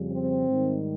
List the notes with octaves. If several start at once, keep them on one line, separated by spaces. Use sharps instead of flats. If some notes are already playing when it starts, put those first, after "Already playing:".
Already playing: F2 C#3 G3
C4
G#2 D#3 G3